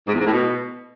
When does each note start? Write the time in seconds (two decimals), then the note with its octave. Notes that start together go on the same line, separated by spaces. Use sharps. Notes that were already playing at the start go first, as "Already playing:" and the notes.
0.08 G#2
0.14 E2
0.20 G#2
0.27 A2
0.33 B2